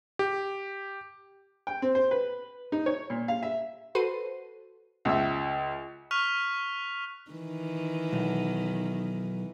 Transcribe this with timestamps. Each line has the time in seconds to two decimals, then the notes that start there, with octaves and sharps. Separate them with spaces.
0.19 G4
1.67 G5
1.82 C4
1.95 C5
2.11 B4
2.72 D#4
2.86 C#5
3.10 A#2
3.28 F5
3.43 E5
3.95 F#4 A4 B4 C5 C7 D#7
5.05 C#2 E5
6.11 C#6 F6 F#6 B6 F7
7.31 D#3 E3
8.13 B1